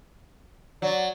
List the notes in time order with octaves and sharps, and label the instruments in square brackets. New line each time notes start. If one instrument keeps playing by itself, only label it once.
[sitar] F#3 [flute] D5